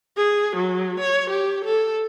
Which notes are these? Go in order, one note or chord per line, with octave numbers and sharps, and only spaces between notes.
G#4
F#3
C#5
G4
A4